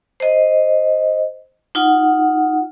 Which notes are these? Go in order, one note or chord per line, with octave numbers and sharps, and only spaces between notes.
C5 D#5
D#4 F4 F#5